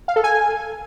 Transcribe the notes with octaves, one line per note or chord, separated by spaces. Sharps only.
F5
A4
G#5